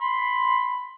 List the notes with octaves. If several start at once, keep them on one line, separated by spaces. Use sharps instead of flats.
B5 C6